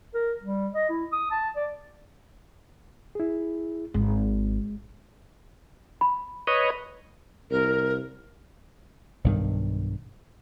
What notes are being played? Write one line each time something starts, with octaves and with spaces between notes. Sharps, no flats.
A#4
G3
D#5
E4
D#6
A5
D5
E4 G#4
G#1 G#3
B5
B4 C#5 D#5
C2 A#4
B1 G2 D#3